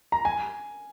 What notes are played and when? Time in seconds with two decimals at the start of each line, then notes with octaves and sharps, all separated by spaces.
0.12 A#5
0.25 G#5